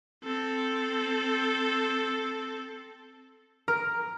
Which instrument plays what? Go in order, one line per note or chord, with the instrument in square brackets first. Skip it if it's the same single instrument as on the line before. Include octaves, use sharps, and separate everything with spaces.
[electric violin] C4 A4
[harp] A#4